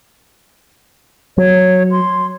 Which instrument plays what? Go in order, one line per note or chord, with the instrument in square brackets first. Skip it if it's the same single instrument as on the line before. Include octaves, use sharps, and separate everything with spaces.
[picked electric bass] F#3 [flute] C#5
[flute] C6